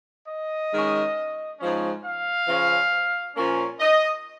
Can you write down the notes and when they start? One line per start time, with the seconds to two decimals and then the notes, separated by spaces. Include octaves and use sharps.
0.27 D#5
0.71 D#3 G#3 C#4
1.59 G#2 F3 G#3 C#4
2.03 F5
2.47 C#3 F3 C#4
3.35 A#2 F3 A#3 C#4
3.79 D#5